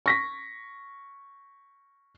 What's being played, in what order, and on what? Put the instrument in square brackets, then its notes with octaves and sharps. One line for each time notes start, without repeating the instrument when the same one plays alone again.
[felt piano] C#6 A#6 B6